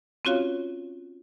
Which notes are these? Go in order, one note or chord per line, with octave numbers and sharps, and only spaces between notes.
C4 C#4 F4 F#4 C#5 F5